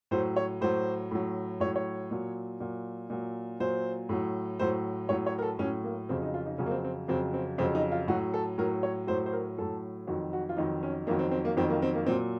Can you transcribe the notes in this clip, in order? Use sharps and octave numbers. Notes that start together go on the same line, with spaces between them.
A2 F#3 C5
C#5
A2 F#3 C5
A2 F#3
A2 F#3 C#5
C#5
A#2 F#3
A#2 F#3
A#2 F#3
A#2 F#3 C5
A2 F#3
A2 F#3 C5
A2 F#3 C#5
C#5
A#4
A4
A2 F#3 C#4
A#3
F2 C#3 F#3 C4
D#4
F4
D#4
F2 C#3 F#3 C#4
A#3
C4
C4
F2 C#3 F#3 C4
C4
F2 C#3 F#3 C4
D#4
F4
A2 F#3 F#4
A4
A2 F#3 A#4
C#5
A2 F#3 C5
C5
A#4
A2 F#3 A4
F2 D#3 F#3 F#4
F#4
F4
F2 D#3 F#3 D#4
C#4
F2 D#3 F#3 A#3
C4
C4
A#3
F2 D#3 F#3 C4
A#3
C4
A#3
A#2 F#3 C4